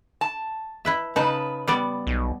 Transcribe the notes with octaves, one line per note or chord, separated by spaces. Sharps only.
A5
E4 B4 E5
C#3 D#4 B4 A5
G3 B3 D5
B1